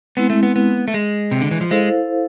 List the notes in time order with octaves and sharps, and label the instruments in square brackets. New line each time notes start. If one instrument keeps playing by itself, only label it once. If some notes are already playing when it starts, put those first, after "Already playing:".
[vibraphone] G#3 C4 E4 [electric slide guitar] B3
[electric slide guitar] A3
B3
B3
A3
G#3
C3
D3
E3
F3
[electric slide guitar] G#3 [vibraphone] E4 A4 C5 F5